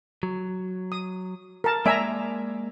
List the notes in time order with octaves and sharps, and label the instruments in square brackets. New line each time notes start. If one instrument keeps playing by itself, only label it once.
[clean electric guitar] F#3
[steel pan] D#6
A#4 A5
[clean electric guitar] G#3 A#3 D5 [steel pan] E5 G#5 A#5